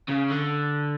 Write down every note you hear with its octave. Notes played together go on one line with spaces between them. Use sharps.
C#3
D3